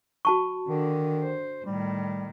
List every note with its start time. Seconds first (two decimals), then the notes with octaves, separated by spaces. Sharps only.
0.25 F#4 A5 C#6
0.68 D3 D#3 D4
1.23 C5
1.66 A2 D#3 G3